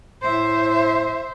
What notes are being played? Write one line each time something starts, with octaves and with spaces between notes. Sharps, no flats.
A2 C5 E5